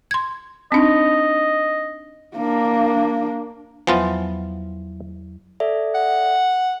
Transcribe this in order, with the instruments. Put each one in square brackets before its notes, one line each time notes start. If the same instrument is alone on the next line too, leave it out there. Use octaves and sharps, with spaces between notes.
[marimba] C6 G#6
[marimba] C4 D4 D#4 [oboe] D#5
[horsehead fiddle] A#3 D4
[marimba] E2 F#3 E5 [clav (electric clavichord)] F3 B3 F4
[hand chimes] A4 D5 E5
[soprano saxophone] F#5